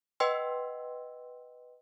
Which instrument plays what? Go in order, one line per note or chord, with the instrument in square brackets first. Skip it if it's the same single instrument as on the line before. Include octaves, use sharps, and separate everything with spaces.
[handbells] B4 D#5 F#5 G5 C6 E6